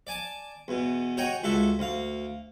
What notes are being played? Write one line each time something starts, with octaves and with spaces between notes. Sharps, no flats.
D5 G#5 A5
E2 B2
F#4 C#5 D#5 G5 G#5 A#5
C#2 F#4 A4 E5
D2 F5